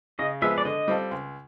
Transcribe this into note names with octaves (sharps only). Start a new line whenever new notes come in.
C#3 D#5
F3 G#3 B3 E5
D5
D3 D#5
G3 C4 F4 A4
C#2